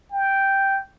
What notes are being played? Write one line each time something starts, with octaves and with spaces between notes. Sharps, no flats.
G5